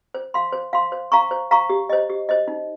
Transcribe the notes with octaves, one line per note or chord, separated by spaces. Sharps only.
C5
F5 C6
C5
F5 C6
C5
F5 A#5 C#6
C5
F5 A#5 C#6
G4
C5 D#5
G4
C5 D#5
D#4